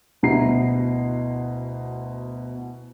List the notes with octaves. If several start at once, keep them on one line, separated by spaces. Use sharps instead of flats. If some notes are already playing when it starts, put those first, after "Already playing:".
D2 B2 E4 A#5 C7